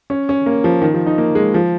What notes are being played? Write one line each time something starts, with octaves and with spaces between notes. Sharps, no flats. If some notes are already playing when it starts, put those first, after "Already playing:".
C#4
C#4
A#3
F3
D#3
F3
D#4
A#3
G#3
F3